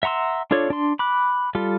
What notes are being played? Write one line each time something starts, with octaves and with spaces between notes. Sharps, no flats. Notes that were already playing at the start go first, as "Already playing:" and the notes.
E5 F#5 A#5 C6 E6
D4 F4 A4 C#5 D5
D4 C6
B5 D6 F#6
G3 F4 A4